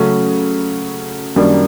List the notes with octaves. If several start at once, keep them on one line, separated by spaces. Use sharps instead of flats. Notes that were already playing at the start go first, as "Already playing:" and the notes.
Already playing: C#3 F#3 A3 C#4
F#2 D#3 G3 A#3 D4